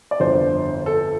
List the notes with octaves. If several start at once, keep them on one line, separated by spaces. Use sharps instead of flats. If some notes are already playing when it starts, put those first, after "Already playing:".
D5
G1 F2 D3 C5
A4